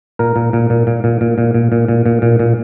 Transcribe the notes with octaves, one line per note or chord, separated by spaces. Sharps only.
A#2 A#4
A#2
A#2
A#2
A#2
A#2
A#2
A#2
A#2
A#2
A#2
A#2
A#2
A#2